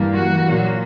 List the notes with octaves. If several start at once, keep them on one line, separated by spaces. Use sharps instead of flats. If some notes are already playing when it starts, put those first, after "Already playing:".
Already playing: G2 E3 G3 A#3
F#4
A#2 F#3 A#3